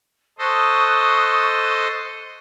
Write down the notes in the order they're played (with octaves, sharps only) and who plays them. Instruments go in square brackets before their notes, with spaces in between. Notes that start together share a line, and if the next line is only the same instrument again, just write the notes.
[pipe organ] A4 C5 D#5 [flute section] C#6 D#6 F#6